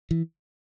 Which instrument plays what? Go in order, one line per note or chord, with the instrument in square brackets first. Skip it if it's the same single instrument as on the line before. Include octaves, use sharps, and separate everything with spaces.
[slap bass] E3